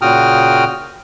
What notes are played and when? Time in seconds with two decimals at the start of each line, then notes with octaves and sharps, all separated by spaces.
0.02 A#2 C#3 F#4 G5 D#6 F6